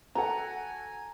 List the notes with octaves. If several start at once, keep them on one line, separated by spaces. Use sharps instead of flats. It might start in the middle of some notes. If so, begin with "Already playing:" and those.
F#4 A4 F#5 G#5 A#5